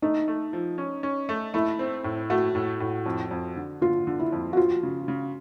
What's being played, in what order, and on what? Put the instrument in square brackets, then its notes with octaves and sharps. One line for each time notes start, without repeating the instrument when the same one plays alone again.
[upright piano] A3 [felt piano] D#4
[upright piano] A3
F3
C#4
C#4
A3
[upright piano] A3 [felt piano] E4
[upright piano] C4
A2
[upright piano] A3 [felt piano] F#4
[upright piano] A2
A2
F2
F2
D3
[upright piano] D3 [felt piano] F4
[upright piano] D3
[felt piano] E4
[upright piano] F2
[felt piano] F#4
[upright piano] F3 [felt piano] F4
[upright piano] C#3
C#3